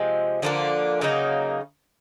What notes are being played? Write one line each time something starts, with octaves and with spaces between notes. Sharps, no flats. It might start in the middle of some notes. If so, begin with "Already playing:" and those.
Already playing: C3 F3 G#3
D3 F3 A#3 D4
C#3 F#3 A#3 D#4